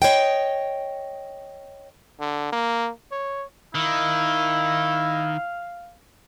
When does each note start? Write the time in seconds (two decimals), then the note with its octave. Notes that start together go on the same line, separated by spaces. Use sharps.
0.02 C#5 D#5 G5
2.20 D3
2.52 A#3
3.12 C#5
3.75 D#3 E4 F5